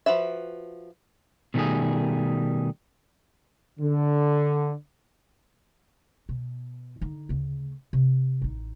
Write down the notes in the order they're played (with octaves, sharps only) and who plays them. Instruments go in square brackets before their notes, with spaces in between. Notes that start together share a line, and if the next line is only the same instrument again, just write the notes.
[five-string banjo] F3 F#4 B4 E5
[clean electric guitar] B2 D#3 F#3 G3 A3 G#4
[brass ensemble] D3
[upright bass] B2
D3 D#4
D2 C#3
C3
A1 D#4